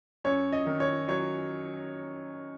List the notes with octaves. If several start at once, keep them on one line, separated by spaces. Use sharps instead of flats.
F#2 C#5
D#5
D#3
C#5
F#3 C#5